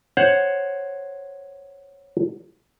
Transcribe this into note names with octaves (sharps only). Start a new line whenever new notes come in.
C5 C#5 F#5